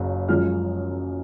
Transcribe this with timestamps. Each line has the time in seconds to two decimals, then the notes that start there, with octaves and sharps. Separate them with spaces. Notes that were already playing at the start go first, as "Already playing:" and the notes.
Already playing: F#1 F#2 C#3
0.28 F#2 F3 G#3 F6